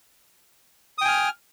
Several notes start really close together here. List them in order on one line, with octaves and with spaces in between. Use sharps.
D#6 G5 G#5 F6